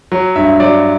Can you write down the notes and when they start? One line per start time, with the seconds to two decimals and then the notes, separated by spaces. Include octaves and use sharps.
0.12 F#3
0.36 G2 E5
0.60 F#3 D5